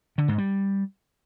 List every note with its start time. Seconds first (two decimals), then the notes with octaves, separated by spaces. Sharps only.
0.18 D3
0.28 G#2
0.38 G3